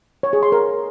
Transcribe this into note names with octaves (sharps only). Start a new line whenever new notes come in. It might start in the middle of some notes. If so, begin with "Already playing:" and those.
C#5
G#4
C6
A#4